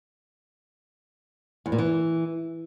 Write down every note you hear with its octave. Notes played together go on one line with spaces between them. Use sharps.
E2
A#2
E3